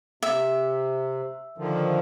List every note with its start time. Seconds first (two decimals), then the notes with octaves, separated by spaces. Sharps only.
0.23 C3 E5
1.58 D3 D#3 F3